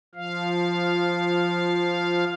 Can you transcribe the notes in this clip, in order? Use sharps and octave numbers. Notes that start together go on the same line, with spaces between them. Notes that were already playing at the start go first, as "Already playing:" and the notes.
F3 F5